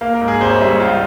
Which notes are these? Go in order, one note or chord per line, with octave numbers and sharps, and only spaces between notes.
A#3 F5
A#4
G#2
G#4
G#1 C5
C#5
G3 E5
C#5
C#2 F4